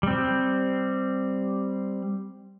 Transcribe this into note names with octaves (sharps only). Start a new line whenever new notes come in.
G3 C4